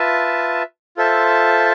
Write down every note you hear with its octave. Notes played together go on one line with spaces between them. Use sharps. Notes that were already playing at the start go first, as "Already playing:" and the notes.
Already playing: F4 B4 E5 A5
F4 A4 C5 E5 A5